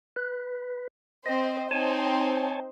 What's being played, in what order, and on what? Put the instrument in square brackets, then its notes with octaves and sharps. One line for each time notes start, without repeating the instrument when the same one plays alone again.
[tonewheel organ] B4
[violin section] C4 C5 [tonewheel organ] D#5
[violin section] C4 D#4 C5 [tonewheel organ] C#5 G#5 A5